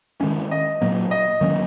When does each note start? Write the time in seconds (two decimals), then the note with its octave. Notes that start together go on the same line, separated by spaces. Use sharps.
0.21 D#3 G#3 C#4
0.51 D#5
0.81 A#2 F#3 A#3
1.11 D#5
1.41 D#3 F#3 A#3 C#4